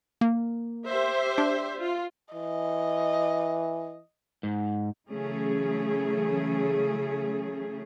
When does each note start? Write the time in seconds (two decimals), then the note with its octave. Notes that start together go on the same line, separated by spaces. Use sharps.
0.21 A#3
0.86 G4 C5 E5
1.38 D4
1.77 F4
2.35 E3 D#5
4.43 G#2
5.09 C#3 E3 F#3 A3 C#4 G#4